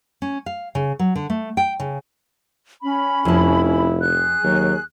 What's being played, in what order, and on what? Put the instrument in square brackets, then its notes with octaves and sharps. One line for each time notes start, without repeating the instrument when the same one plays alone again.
[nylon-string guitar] C#4
F5
C#3
F#3
D3
A3
G5
C#3
[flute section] C#4 B5
[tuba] F1 [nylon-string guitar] F2 A5 [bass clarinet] E4
[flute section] G#4 F#6
[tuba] D#2 [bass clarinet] F#3